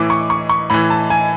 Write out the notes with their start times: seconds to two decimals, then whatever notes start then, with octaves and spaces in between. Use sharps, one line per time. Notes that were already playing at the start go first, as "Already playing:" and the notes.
Already playing: A2 E3 D6
0.10 C#6
0.30 C#6
0.49 C#6
0.70 A2 E3 B5
0.90 A5
1.10 G#5